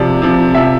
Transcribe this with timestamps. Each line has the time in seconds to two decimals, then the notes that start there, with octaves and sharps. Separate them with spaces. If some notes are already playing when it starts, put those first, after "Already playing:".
Already playing: C3 F3 D5
0.22 C3 F3
0.55 C3 F3 E5